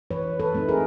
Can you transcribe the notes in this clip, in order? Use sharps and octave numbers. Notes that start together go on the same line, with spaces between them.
E3 B4 C#5
A4 B4
A3 C4 D#4
G#4 A#4